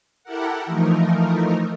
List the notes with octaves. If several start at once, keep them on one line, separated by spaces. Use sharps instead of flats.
E4 G4 A4 A#4 F#5
E3 F3 A3 D#4 A#4